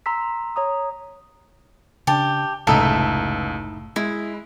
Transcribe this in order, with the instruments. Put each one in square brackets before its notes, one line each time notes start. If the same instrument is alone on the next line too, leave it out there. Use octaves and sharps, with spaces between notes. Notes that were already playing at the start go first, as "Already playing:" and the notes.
[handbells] A#5 C6 E6 B6
C#5 A#5 D#6
[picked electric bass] C#3 D4 [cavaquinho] G4 A5
[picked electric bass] F#1 A2 C3 [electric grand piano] C#2 E6 [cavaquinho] D#4 E4 A4
[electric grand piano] G#3 [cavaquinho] E4